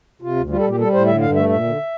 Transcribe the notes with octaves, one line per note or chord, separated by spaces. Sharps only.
C3 F4
D2
G3 F4
A4
A#2
G4
G3 A4
A2 C5
D3 E5
G2 F5
A3 E5
A#2 E5
D3